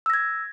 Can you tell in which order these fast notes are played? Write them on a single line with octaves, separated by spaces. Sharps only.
E6 A#6 G#6